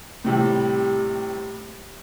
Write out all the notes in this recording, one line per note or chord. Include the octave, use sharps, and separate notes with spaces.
A2 C3 G3